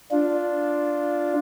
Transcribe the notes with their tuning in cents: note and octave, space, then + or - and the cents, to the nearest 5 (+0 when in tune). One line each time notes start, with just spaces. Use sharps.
D4 +0 F4 +0